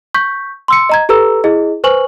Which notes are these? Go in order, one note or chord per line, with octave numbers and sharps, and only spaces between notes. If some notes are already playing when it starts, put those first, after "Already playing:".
C#6 G6 B6
C6 E6 C#7
D#5 A#5 G#6
G4 A4 B4 A#5 E6
E4 G#4 D#5
B4 C5 G#5 C#6 F#7